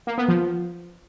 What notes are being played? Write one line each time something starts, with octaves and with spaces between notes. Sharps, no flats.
A#3
B3
F3